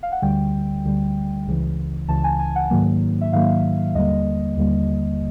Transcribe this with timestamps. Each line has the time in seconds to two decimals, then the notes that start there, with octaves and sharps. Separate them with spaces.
0.03 F5
0.12 F#5
0.22 D2 D3 G3 G5
0.84 D2 D3 G3
1.47 C#2 C#3 E3
2.08 C#2 C#3 E3 A5
2.24 G#5
2.39 G#5
2.56 F#5
2.70 G#2 D#3 F#3 A#3
3.21 E5
3.33 G#2 D#3 F#3 A#3 F5
3.94 D#2 D3 G3 A#3 D#5
4.57 D#2 D3 G3 A#3